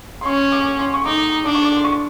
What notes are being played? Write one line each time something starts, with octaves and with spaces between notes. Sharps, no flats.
C6
C#4 C#6
D6
C6
C#6
D#4 D6
D4 D6
C#6
D6
C6
C#6